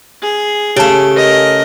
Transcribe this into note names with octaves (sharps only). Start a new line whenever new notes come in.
G#4
C#3 A3 G4 G#5 A5
A#4 D#5